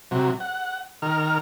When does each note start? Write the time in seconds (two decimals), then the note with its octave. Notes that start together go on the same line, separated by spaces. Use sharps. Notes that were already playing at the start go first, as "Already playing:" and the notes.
0.11 C3 F#3
0.40 F#5
1.02 D#3 A#4 F6